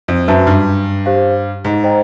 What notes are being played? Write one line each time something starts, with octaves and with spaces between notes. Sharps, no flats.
F2
F#2 F#4 B4 E5 A5
G2
G4 C5 F5
G#2
C5 D#5 G5 A#5